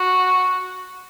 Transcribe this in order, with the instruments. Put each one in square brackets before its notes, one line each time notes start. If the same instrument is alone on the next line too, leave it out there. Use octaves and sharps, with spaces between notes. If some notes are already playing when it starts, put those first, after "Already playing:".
Already playing: [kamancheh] F#4